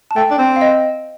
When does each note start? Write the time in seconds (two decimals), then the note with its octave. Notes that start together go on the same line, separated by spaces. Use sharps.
0.11 A5
0.16 A3 G5
0.31 D4
0.38 C4
0.56 F5
0.61 D#5